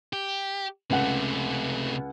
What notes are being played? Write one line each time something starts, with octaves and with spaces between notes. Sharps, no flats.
G4
C#2 C3 A3 F#5